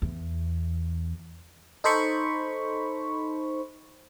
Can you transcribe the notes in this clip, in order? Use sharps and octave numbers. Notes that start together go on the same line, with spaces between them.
E2
D#4 A4 C5 B5 C#6